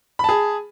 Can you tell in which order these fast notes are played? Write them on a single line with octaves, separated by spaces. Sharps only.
B5 A5 G#4